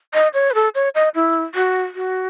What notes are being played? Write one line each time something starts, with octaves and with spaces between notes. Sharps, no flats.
D#5
C#5
B4
A4
C#5
D#5
E4
F#4
F#4